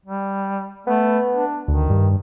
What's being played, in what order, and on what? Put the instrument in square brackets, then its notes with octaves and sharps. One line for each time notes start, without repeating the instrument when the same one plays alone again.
[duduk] G3
[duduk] A3 [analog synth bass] B3
[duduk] D4
[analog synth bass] D2 [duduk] D#3
[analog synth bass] G2